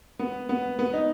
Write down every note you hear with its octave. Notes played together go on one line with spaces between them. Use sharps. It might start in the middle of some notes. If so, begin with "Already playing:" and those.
B3
B3
B3
D#4